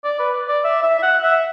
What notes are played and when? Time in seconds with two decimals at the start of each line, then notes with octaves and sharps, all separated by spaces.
0.04 D5
0.19 B4
0.48 D5
0.64 E5
0.83 E5
0.99 E5
1.02 F#5
1.23 E5